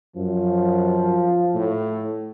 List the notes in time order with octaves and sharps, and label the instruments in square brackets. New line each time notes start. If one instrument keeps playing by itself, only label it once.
[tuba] F#2 [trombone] F3
[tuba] A2